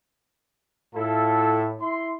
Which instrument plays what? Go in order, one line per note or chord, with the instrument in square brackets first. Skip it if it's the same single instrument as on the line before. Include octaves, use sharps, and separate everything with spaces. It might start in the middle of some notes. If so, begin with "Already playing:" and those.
[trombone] A2 [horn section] E4 F4 A4
[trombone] E4 [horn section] C6